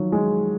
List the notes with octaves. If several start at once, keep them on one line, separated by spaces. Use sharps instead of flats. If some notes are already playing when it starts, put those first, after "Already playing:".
Already playing: D#3 F3 F#3
G#3